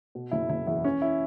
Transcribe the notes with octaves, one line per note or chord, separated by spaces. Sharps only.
B2
F#1 E4
F#1 E4
E2 E4
E3 C#4
E4